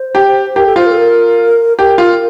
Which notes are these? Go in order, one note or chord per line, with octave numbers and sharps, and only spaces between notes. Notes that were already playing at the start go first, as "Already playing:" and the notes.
Already playing: C5
G4
G4 A#4
A4
F4 C5
A#4
A4
A#4
G4 A#4
F4